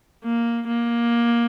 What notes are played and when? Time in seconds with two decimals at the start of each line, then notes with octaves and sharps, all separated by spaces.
0.25 A#3
0.68 A#3